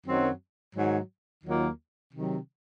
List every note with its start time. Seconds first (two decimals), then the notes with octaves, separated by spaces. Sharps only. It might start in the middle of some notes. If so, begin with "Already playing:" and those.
0.06 F#2 D#3 F#3 C4
0.74 G#2 D#3 F#3
1.44 D#2 D#3 F#3 A#3 F4
2.13 C3 D#3 F#3